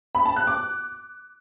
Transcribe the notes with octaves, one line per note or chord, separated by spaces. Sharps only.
B5
A5
F#6
D6